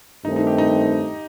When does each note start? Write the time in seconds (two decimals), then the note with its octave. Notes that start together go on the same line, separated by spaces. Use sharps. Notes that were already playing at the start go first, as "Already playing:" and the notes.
0.25 G2 D#3 A3 C4 D#4
0.36 D#4
0.47 G4
0.58 D#4